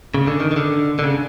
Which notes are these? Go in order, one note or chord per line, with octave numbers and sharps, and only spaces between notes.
C#3
D3
D#3
D#3
D3
D3
C#3